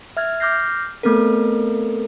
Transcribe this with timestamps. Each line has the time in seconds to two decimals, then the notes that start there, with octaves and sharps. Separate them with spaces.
0.17 E5 F6 G#6
0.40 D6 F6 G6 A#6 C7
1.03 A3 B3 C4 A4 A#4